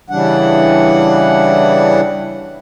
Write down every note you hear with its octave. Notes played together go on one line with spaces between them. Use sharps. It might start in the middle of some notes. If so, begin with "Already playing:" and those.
C#3 E3 G3 D4 F#5